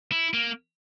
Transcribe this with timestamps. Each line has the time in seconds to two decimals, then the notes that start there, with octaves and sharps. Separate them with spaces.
0.12 E4
0.34 A#3